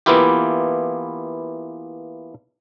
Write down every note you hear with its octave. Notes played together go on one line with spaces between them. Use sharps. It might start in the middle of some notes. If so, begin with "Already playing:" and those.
E3 A#3 B3 E4 F4 G4